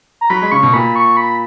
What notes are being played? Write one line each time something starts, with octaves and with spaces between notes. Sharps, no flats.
A#5
F#3 B5
G#3 B5
C#3 C#6
B2
A#2 B5
C#6
B5